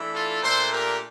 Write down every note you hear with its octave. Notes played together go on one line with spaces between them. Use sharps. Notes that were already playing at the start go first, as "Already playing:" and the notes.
Already playing: E3 A3 D4
F4 A4
A#2 A3 D4 A4 C5
G4 A#4